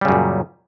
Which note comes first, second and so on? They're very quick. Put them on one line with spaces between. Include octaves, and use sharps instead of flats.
G3 C#3 F#2 A#2